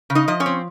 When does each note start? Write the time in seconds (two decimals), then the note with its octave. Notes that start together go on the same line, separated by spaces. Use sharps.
0.10 C#3
0.15 D#4 D#5
0.28 F3 D#5
0.40 C#4 C#5
0.46 C4